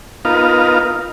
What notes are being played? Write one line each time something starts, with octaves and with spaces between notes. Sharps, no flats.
B3 D#4 F4 A#4 F5